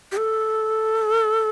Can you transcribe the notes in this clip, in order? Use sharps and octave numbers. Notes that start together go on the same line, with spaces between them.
G4
A4